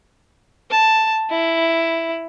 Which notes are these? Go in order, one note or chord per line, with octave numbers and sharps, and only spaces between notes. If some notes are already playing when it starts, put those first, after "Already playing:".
A5
E4